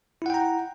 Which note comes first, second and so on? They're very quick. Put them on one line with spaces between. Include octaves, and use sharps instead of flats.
E4 F#5 G5 A#5